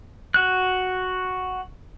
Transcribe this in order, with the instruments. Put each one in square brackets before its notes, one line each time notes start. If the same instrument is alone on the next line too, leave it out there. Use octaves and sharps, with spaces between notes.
[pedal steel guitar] F#4 F#6